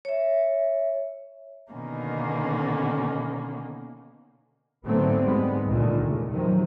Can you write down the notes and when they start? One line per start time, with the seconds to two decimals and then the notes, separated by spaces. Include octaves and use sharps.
0.05 C#5 E5
1.73 B2 D3 D#3 A#3 C#4 D#4
4.85 G#2 D3 F#3 A3 B3 C4
5.22 G#2 G3 G#3 B3
5.66 C#2 A#2 D3 D#3 G#3 A3
6.00 E2 C#3
6.29 C3 D#3 F3 F#3